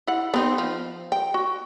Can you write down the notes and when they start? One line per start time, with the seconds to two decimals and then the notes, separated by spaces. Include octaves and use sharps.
0.07 E4 F#5
0.34 B3 C4 D#4
0.58 F3
1.12 G5
1.34 F#4